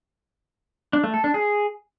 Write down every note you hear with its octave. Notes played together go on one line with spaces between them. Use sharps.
D4
A3
A4
D4
G#4